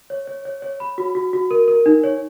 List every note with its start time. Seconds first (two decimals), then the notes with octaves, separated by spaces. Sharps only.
0.10 C#5
0.27 C#5
0.45 C#5
0.62 C#5
0.80 B5
0.98 F#4
1.15 F#4
1.33 F#4
1.51 A#4
1.68 A#4
1.86 D#4
2.04 C#5